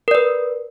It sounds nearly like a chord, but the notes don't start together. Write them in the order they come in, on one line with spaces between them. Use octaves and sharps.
A#4 D5 B4